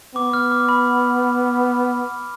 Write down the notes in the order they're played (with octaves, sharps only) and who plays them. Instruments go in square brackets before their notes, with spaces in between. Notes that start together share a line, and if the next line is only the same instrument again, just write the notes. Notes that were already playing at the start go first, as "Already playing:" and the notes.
[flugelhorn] B3 [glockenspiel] D6
[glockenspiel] F6
D6
B5